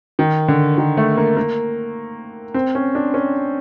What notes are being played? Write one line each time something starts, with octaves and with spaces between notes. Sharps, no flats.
D#3
D3
D#3
A3
A#3
A#3
C4
C#4
D4
C#4